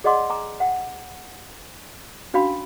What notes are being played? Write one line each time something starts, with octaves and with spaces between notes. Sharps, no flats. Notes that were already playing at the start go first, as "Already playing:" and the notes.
G#4 D5 D#5 F#5 C6 D6
G#5 A#5 D6
F#5 G5
C#4 D4 F#4 F5 B5